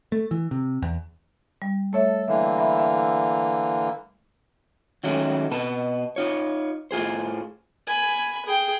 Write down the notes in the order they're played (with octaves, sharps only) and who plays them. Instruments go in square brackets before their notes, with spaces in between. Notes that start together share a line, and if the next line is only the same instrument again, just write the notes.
[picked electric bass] A3
E3
C3
E2
[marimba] G3
[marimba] A3 C#5 E5 [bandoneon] A4
[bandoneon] D3 E3 A#3 [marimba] E5
[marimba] E5 B5
E5
[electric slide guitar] D#3 F#3 G#3 A3 C#4
B2 B4 A5
D#4 F4 C#5
A2 F4 G#4 C5
[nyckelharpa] G#5 B5
G#4 G5